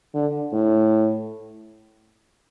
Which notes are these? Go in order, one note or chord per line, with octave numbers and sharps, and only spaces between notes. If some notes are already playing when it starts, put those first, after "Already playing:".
D3
A2